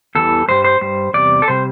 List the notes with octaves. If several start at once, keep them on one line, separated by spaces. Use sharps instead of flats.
E2 E3 G3 A4
G2 G3 C5
C5
G2 G3 C5
E2 C3 G3 D5
A4
C3 G3 C5